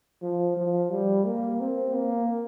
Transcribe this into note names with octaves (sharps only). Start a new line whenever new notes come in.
F3
F3
G3
A#3
C4
A#3